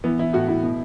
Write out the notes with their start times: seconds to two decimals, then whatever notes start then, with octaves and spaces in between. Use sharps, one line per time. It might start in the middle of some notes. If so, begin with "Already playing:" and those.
0.04 E3 B3
0.19 E3 E4
0.33 A2 F#4
0.48 A2 E4
0.63 B2